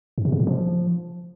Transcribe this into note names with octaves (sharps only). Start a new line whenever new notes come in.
G#2
C3
C#3
A#2
F3